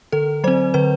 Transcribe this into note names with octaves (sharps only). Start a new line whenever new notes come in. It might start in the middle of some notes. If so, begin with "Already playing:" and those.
D3 A4
F#3 C4 C5
D3 B4